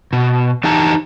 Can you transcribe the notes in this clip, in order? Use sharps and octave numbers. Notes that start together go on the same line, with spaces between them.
B2
E3 D#4 G4 A5 A#5